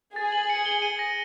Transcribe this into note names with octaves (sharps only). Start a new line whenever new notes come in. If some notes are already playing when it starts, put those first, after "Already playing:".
G#4 A6
F#7
C#7
G7
D#7
A#6